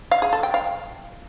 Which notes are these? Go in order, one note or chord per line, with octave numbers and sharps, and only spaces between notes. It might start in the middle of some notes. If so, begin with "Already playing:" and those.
F5
G#4
A4
G5
F5